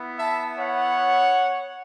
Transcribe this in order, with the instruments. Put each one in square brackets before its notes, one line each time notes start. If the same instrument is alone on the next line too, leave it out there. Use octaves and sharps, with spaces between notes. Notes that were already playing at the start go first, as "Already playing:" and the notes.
Already playing: [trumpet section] B3 E4
E5 A5
C#5 F#5